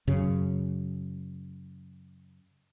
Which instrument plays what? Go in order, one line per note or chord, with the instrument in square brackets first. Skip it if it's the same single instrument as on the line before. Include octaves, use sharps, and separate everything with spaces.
[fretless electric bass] F#2 C#3